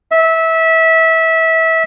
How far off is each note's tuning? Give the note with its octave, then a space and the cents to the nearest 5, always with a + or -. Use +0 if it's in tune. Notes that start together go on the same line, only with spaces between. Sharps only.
E5 -20